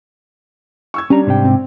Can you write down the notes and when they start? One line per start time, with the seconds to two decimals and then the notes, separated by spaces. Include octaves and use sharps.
0.94 C#6 E6 G#6
1.10 G3 C#4 D4 A#5
1.27 G#2 C3 G5
1.45 C4